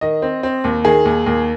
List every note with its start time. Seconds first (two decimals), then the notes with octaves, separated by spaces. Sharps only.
0.01 D#3 D#5
0.22 C4
0.43 C4
0.64 D#2
0.84 D#3 G#4
1.05 D#2
1.26 D#2